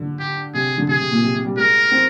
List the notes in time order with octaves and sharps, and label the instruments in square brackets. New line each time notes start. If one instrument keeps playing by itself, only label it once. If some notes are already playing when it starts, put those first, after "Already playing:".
Already playing: [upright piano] D3
[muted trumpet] G4
[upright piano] C3 [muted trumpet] G#4
[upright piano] D3
[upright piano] C3 [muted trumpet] G#4
[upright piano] C3
A#2
C3
C3
G3
[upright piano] G#3 [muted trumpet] A#4
[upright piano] C4